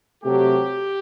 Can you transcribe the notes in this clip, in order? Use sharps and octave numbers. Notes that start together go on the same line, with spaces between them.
C3 F#3 A3 G4